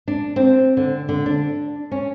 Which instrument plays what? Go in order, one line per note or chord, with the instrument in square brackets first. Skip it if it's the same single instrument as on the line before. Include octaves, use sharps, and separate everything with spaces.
[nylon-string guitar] D4
C4
D3
D3
D4
C#4